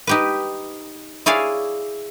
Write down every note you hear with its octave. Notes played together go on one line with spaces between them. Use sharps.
D#4 G4 B4
E4 G#4 C#5 D5 F5 G#5